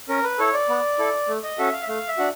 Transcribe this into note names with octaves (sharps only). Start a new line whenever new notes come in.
C#4 A#4
B4
E4 A4 C#5
D5
B3
E4 A4
A3
D#5
C#4 F#4 A4 E5
F5
E5
A3 F5
E5
D4 F#4